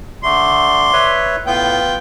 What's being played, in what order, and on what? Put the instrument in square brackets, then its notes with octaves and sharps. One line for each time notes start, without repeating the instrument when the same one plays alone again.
[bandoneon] D3 A3 [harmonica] D5 C6
[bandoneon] B4 C#5 E5
[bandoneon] A2 [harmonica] B3 F4 G5